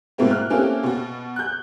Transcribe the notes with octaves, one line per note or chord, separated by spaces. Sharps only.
G#2 B2 A#3 C4 E4
F6 F#6
A#3 C4 C#4 E4 G4 A4
B2 F#4
F#6 G6